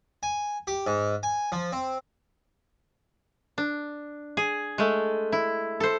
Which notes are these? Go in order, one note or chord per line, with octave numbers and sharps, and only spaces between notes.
G#5
G4
G#2
G#5
F3
C4
D4
G#4
G#3 A3
E4
A4 C5